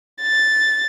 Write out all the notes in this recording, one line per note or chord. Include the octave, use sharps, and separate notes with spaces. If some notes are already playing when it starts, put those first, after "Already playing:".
A6